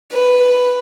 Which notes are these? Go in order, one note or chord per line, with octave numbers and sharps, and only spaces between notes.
B4